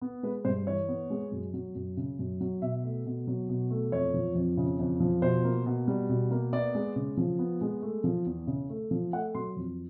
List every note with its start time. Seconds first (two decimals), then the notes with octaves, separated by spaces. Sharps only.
0.01 B3
0.23 G#3 B4
0.45 G2 C5
0.67 E3 C#5
0.88 B3
1.10 G#3
1.32 F#2
1.54 F#3
1.75 F#2
1.97 C#3
2.19 F#2
2.41 F#3
2.62 B2 E5
2.84 A3
3.06 B2
3.27 F#3
3.49 B2
3.71 A3
3.92 F2 C#5
4.14 F3
4.35 F2
4.57 C#3
4.79 F2
5.00 F3
5.22 B2 C5
5.44 A#3
5.66 B2
5.88 G3
6.09 B2
6.31 A#3
6.53 B3 D5
6.75 G#3
6.96 C#3
7.17 F3
7.39 B3
7.61 G#3
7.82 A3
8.04 F3
8.26 E2
8.47 C#3
8.70 A3
8.91 F3
9.13 A3 F#5
9.35 F#3 C6
9.56 F2